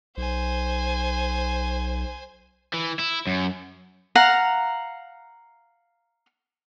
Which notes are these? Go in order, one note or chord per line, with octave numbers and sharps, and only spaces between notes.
B1 C5 G#5
E3
E4
F#2
F5 F#5 A#5